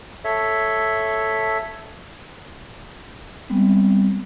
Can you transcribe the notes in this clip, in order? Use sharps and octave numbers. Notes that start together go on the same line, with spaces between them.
A4 C#5 E5
G3 G#3 B3 C4